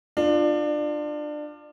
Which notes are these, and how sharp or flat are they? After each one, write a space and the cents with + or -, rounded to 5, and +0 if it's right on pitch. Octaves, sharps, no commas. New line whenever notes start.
D4 +25 F4 +0